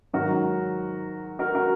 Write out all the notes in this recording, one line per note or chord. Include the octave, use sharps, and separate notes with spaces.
G#2 D#3 F#3 F#4 A#4
F#4 A#4
F#4 A#4